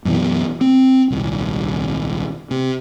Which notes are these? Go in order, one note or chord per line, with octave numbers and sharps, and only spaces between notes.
F#2 B2 E3
C4
D#1 C2
C3